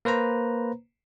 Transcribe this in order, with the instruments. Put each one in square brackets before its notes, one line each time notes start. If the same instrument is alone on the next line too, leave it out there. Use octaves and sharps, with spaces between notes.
[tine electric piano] A#3 B4 C5 A#5